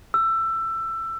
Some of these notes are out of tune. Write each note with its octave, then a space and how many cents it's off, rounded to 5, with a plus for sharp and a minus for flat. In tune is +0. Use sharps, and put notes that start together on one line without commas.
E6 +20